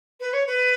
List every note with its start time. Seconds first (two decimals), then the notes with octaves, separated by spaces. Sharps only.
0.20 B4
0.33 C#5
0.47 B4